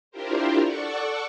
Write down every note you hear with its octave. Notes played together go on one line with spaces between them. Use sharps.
D4 E4 F4 G4 A#4 C5
A4 D5 F#5 C#6